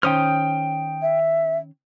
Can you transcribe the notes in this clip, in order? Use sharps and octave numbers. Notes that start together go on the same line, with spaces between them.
D#3 C#4 C5 G5 D#6 F6
E5